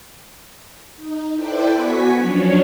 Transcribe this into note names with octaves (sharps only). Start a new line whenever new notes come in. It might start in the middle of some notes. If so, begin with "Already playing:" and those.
D#4
E4 A4 B4 C5 D5 G5
B3 F#4 G#5 C#6 B6
F3 F#3 C#4 D4 C#5